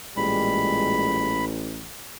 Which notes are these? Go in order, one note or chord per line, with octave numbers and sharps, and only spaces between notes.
A1 A#2 G3 G#3 B5